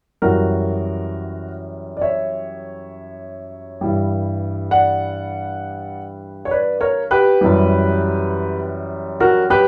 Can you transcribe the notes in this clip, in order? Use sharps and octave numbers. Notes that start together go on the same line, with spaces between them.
F#2 E3 G3 F#4 A#4
D5
C#5 E5
G2 E3 G3
D5 F#5
C#5
B4 D5
A#4 C#5
G4 B4
F#2 E3 G3
F#4 A#4
G4 B4